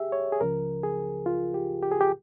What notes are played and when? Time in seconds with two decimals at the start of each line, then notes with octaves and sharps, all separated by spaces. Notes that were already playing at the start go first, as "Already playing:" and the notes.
Already playing: G4 G#4 E5
0.12 C#5
0.32 G#4
0.41 C#2 C#3 F3 A#4
0.83 G#4
1.26 F4
1.54 G4
1.83 G4
1.91 G#4
2.01 G4